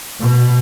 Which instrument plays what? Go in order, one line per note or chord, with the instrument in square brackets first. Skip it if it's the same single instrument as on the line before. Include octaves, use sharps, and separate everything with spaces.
[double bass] B2